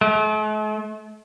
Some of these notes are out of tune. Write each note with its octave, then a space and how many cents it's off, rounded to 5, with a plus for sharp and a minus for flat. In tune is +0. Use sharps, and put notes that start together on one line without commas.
A3 -45